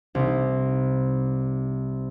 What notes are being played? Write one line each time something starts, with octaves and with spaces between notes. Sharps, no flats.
C2 D#4